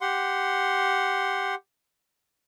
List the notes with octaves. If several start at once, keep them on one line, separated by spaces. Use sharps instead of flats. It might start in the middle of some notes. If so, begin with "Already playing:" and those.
G4 F#5 C6